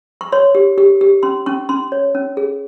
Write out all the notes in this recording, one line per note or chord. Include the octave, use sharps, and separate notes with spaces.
C#6
C#5 C6
G4
G4
G4
C#4 C6
C#4 C#6
C#4 C6
C#5
C#4
G#4